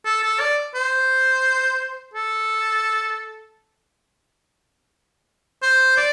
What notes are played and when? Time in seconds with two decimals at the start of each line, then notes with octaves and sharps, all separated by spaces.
0.05 A4
0.23 A4
0.40 D5
0.75 C5
2.14 A4
5.63 C5
5.97 D5